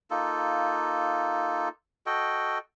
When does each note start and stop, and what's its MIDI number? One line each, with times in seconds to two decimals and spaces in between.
0.10 1.69 58
0.10 1.69 63
0.10 1.69 65
0.10 1.69 69
2.06 2.58 66
2.06 2.58 69
2.06 2.58 75
2.06 2.58 79